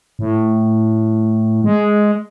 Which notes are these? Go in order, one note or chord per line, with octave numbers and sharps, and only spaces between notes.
A2
G#3